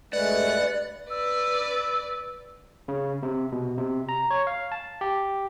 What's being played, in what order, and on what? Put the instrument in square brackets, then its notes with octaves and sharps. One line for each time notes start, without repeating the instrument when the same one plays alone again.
[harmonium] G2 G#3 A3 [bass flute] B4 [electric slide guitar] D5 [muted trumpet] F#5
[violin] B4 D5 [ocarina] E6
[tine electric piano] C#3
C3
B2
C3
A#5
C#5
F5
A5
G4